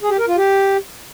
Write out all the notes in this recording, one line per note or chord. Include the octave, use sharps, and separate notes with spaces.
G#4
G4
A#4
F4
G4